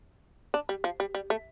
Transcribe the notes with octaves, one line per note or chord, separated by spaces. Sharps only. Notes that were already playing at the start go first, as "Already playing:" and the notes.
D4
G3
F3
G3
G3
A3